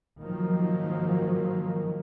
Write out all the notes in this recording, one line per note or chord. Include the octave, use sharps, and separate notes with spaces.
G#2 D#3 F3 F#3 A#3